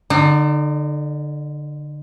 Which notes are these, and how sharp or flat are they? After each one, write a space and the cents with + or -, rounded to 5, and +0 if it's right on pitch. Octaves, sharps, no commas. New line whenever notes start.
D3 +0 D#4 -35